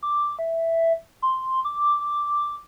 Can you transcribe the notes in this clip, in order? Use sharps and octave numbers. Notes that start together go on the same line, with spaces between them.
D6
E5
C6
D6
D6